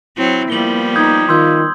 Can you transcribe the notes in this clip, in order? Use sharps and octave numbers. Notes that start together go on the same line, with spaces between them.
F#3 C4 E4
F3 G3 A#3 B3 F#7 G7
D#4 D#6 G6 G#6
D#3 F4 C6 E6 G6